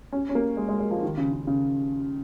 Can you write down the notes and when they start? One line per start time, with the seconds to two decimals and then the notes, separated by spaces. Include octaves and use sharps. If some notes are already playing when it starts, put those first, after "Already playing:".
0.12 C#4
0.29 C#4
0.35 A#3
0.57 G#3
0.69 G#3
0.80 G#3
0.91 F3
1.02 D#3
1.17 C#3
1.33 C#3
1.47 C#3